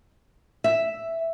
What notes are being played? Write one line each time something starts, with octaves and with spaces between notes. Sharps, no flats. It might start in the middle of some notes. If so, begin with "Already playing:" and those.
E5